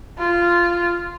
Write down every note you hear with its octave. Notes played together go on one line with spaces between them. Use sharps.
F4